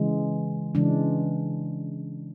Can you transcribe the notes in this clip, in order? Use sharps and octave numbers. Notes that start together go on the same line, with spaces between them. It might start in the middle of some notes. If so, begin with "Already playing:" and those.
Already playing: C#3 E3 G#3
C#3 E3 G#3 D4